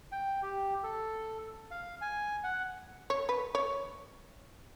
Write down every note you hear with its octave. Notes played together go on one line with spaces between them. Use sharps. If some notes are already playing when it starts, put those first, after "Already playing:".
G5
G4
A4
F5
G#5
F#5
C#5
B4
C#5